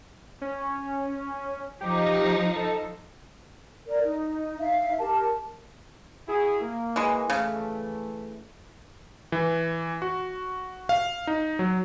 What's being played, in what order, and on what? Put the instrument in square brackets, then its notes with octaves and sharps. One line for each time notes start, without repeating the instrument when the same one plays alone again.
[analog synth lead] C#4
[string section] F3 D#4 [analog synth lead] G4
[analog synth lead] A4
[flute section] A#4 D5
D#4
D#4 E5 F5
G4 A#4 A5
[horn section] E4 F#4 G#4
A#3
[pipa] E3 G#3
[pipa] C#3 [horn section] E3 A3
[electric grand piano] E3
F#4
F5
D#4
F#3